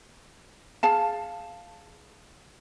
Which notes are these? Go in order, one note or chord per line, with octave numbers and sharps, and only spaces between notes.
G#4 F5 A5